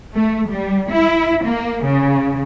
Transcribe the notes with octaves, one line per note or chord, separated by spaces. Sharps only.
A3
G3
E4
A#3
C#3